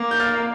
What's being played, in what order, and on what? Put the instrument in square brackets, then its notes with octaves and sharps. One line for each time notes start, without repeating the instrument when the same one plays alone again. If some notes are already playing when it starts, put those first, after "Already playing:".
Already playing: [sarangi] A#3 [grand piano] D6
[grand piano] G6
F6 A6